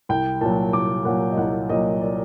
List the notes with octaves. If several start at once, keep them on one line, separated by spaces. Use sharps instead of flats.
C2 G5
A#2 F#3 A5
C2 D6
A#2 F#3 F#5
D#5
C2 F#5
A#2 F#3 D#5
D5